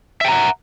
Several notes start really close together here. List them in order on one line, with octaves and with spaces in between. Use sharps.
E5 G5 A#5 F#5